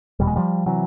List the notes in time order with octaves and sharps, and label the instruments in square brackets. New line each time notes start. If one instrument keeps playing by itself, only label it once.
[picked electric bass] F1 E2 B2 G3
G#3
F3 G3
C3 E3 F#3